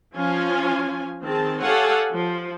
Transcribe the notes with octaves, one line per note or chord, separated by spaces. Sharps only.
F3 C#4 F4 G#5
D#3 C4 G#4 A5
G4 A4 C#5 F5 F#5 G#5
F3